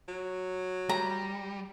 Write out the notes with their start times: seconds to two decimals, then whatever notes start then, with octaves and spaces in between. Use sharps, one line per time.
0.08 F#3
0.89 G3 A#5